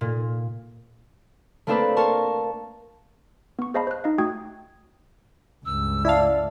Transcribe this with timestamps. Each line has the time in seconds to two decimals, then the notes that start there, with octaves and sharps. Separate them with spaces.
0.01 A#2
1.67 A3 A#3 C4 D4 A4 B4
1.97 A#4 A5 C6 C#6
3.59 B3 C#6
3.74 G#4 C5 D#5 F5 A5 B5
3.87 C5 F#6
4.04 D#4 D#5 F5
4.18 A3 F#4 G5 D#6 G#6
5.65 C#2 G2 E6
6.05 E4 D5 E5 F5 A5